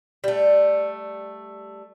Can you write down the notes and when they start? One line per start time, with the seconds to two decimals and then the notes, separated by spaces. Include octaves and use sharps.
0.24 G3 A3